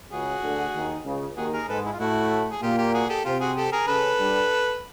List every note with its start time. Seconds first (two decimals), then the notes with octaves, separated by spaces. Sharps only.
0.11 C#2 C#3 F#4 G#4
0.43 D2 D3
0.74 D#2 D#3
1.05 C#2 C#3
1.36 D#2 D#3 F#4 G#4
1.53 G#4 A#4
1.68 G#2 G#3 A4 B4
1.86 E4
1.92 F4
2.00 A2 A3 E4 F#4
2.51 G#4
2.62 A#2 A#3 F4 G4
2.78 F4 G4
2.93 F#4 G#4
3.09 G4 A4
3.25 C3 C4 F4 G4
3.40 F#4 G#4
3.57 G4 A4
3.72 G#4 A#4
3.87 C#3 C#4 A4 B4
4.19 G2 G3